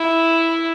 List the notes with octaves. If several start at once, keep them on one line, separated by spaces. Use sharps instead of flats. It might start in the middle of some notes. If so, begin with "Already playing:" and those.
Already playing: E4